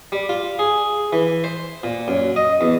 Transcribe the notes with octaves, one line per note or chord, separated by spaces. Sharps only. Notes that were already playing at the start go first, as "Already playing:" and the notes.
G3
F4
G#4
E3
C5
A#2
F#2
D#5
E2